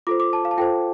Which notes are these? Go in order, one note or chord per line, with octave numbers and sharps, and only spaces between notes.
F4 A4 C5 D6
D6
A5
F5
A5
F4 A4 C5 G5